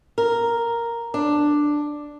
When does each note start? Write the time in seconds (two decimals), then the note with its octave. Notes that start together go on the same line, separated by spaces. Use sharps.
0.18 A#4
1.14 D4